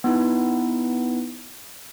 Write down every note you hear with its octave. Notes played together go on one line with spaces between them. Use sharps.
B3 D#4 E4 B4